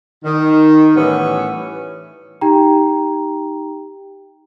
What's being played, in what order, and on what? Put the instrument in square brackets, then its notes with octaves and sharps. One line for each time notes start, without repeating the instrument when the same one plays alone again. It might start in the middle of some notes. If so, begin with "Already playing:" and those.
[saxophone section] D#3
A2 E3 G3 B3 C#4
[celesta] D#4 G4 G5 A#5